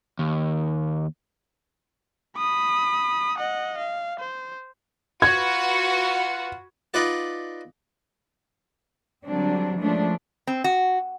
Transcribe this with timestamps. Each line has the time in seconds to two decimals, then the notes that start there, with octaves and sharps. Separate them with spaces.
0.19 D#2
2.38 B5 D#6
3.38 D#5 F#5
3.78 F5
4.20 C5
5.22 F4 F#4 B4 F#5 G#6
6.94 D#4 F4 B4 D5 F#5
9.24 D3 F#3 G3 C4 D4
9.79 E3 F3 G#3 A3 C#4 D4
10.47 C4
10.64 F#4